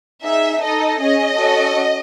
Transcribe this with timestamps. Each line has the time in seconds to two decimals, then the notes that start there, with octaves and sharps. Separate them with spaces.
0.23 D#4 G#4 E5
0.61 D#4 A4 D#5
0.99 C#4 G#4 D#5
1.37 C#4 F#4 A4